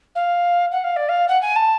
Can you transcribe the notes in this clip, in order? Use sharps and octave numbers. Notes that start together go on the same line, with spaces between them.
F5
F#5
F5
D5
F5
F#5
G#5
A5